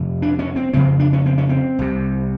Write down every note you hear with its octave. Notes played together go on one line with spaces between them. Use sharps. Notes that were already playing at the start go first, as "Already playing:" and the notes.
Already playing: F2 C3
D4
C#4
C4
F2 C#3 C4
D4
C#4
C4
C#4
C4
C2 C3